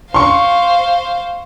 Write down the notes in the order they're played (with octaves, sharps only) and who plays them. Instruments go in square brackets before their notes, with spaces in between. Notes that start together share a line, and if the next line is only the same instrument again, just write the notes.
[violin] C5 F5 [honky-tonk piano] C6 C#6